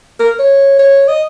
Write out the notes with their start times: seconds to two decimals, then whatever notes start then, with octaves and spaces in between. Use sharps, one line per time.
0.20 A#4
0.39 C#5
0.79 C#5
1.08 D#5